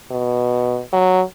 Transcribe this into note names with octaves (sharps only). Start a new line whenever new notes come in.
B2
F#3